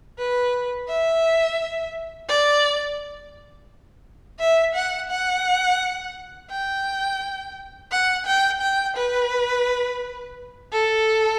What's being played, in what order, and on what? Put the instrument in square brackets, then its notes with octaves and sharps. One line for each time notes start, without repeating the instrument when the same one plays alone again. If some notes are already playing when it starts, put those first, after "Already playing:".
[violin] B4
E5
D5
E5
F#5
F#5
G5
F#5
G5
G5
B4
A4